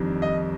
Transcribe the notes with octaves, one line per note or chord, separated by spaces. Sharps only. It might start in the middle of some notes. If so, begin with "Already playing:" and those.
Already playing: F2 D#3 G3 D4
D#5